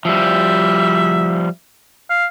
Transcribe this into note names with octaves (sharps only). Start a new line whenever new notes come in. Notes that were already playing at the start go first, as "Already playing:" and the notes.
F3 G3 E5
F5